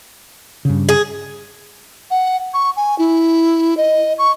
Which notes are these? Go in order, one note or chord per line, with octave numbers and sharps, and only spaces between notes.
G2 C#3
G#4
F#5
C#6
G#5
E4
D#5
C#6